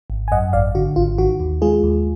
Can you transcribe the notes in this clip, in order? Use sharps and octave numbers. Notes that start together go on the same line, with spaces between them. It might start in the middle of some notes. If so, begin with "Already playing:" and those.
G#1
G#5
F#2 D#5 F#5
G#1 D5 F5
D3 F#4
G#1 F4
D#3 F#4
D#2
G#3 F4 G#4
D#2